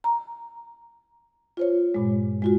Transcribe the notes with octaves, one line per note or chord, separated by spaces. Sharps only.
A#5
F4 C5 C#5
G2 A#2 G#3
G#3 F4 F#4